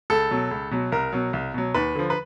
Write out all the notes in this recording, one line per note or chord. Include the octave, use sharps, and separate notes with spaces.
C#2 A4
B2 F#3
C#2
B2 F#3
C2 A#4
B2 F#3
C2
B2 F#3
D#2 B4
D3 F3
B4